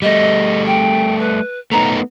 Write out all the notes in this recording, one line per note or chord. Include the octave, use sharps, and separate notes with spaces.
G3 A3 D#5
G5
B4
A3 B3 D#4 A#5